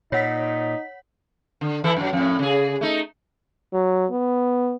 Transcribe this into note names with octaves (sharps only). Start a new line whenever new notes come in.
A#2 D#4 C#5 F#5 B6
D3
E3 E4 A4
F#2 F#3
F2 A2
C#3 G#4
A3 D#4
F#3
B3